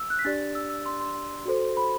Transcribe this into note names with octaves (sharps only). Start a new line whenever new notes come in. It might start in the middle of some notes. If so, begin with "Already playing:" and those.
Already playing: E6
F#6
B6
D4 G4 D5 A6
E6
E6
C6
C6
F#4 A4 C5
B5